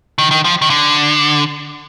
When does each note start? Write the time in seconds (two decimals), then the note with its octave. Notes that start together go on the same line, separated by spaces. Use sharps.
0.18 D#3
0.31 D#3
0.45 F3
0.62 D#3
0.70 D3